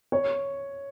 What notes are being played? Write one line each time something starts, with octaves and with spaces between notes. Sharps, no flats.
C#5